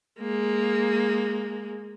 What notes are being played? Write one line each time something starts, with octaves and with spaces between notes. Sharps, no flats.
G#3 A#3